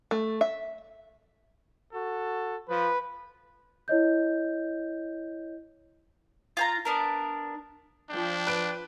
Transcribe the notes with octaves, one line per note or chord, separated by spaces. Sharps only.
A3
E5
F#4 A4
F3 B4
E4 C#5 D#5 G6
F4 G#5 A#5
B3 D4 A#4
F3 D4 G5
B4 F#6 D7